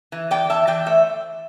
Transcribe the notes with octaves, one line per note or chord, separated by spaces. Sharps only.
E3
E2 D5 G5
E2 E5 A5
E3 D5 G5
A3 C5 E5